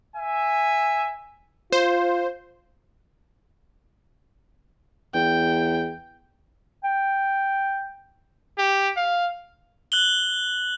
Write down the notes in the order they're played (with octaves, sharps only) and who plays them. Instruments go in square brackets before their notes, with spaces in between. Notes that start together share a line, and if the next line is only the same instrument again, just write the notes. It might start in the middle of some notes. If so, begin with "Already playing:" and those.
[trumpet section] E5 G#5
[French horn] F4 [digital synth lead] C5
[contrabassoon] E2 [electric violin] G5
[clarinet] G5
[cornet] G4
F5
[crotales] F#6 F#7 G7